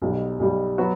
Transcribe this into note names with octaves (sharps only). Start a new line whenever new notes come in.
B1 B2 G3
B1 B2 G3
F#3 B3 F#4